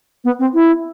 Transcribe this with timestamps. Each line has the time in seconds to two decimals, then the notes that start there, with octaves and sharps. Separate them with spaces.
0.24 B3
0.39 C4
0.54 E4